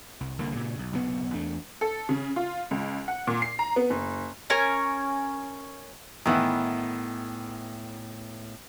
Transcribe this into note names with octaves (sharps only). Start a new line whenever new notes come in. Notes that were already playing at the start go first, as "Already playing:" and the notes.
C2
C2 D3 A#3
G2 A#2 C#3 E3
B1
F#1 B1 C3 B3
E2 A3 D4
A4
C#3
F4
C#2
F#5
A#2
C7
A#5
B3
F#1
C#4 A#4 G#5 C#6
A2 D#3 E3 B3 E4